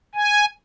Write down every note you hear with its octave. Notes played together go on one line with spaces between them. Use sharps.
G#5